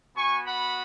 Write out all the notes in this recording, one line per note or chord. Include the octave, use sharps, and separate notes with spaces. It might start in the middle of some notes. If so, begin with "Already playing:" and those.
B3 F#4 G#5 C#6
F#5 B5